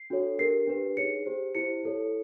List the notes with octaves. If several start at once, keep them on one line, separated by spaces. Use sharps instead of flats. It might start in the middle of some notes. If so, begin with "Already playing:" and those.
Already playing: C7
D4 F#4 A4 C#5
D4 G4 A#4 C7
D4 G4 B4
D#4 G#4 C#5 C#7
G4 C5
E4 G4 C5 C#7
E4 A4 C#5